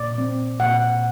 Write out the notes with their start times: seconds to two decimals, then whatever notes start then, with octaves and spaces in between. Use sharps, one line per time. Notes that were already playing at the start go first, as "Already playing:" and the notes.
Already playing: A#2 D5
0.18 C4
0.60 A#2 F#5